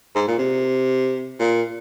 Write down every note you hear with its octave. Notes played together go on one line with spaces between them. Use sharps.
G#2
A#2
C3
A#2